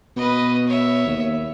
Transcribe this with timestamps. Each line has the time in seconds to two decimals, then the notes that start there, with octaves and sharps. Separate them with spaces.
0.17 B2 B4 D#5
0.67 C#5 E5
1.07 D#2